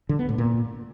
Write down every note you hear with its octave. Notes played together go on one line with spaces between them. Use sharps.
D3
B3
A2
A#2